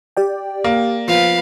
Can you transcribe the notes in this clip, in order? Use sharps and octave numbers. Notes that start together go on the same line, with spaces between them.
G4 D5 G5
A#3
F3 B3 F5